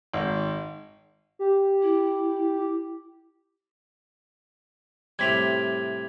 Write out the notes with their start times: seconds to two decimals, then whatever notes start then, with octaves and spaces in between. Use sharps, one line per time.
0.13 G#1
1.39 G4
1.83 E4
5.19 A2 C3 G3 G#6 B6 F7